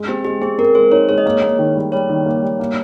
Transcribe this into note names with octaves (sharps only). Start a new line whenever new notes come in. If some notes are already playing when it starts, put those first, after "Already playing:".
Already playing: G#3
C4 G4
G#3 G4
C4 G#4
C4 A#4
G#3 C5
D#4 C#5
G#3 C#5
D#5
A#3 C#5
A#3
D#3
G3
G3 C#5
D#3
A#3
G3
A#3